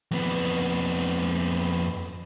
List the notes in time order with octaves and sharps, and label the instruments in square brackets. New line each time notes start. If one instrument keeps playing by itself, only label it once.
[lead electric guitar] F2 B3